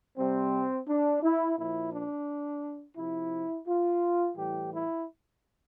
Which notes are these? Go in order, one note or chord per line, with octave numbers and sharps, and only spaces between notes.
C3 G3 C4
D4
E4
A#2 F3 E4
D4
C3 F3 E4
F4
A2 E3 G3 G4
E4